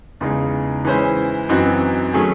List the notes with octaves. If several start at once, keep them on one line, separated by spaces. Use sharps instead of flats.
E2 C#3 G#3 D#4 G#4
E3 G#3 C#4 E4 C5
F#2 E3 C4 D#4 F#4
D#3 F#3 A3 C#4 G#4